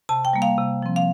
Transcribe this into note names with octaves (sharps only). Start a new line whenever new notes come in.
C3 A5
G5
G3 A#3
F5
C3
F3 C4
F5